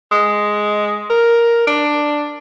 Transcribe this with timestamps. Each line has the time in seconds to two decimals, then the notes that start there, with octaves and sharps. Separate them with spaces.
0.12 G#3
1.10 A#4
1.67 D4